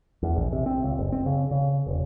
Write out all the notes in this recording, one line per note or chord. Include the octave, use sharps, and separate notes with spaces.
E2
A#1
C3
C4
C#2
F#1
C4
C#3
C#3
E1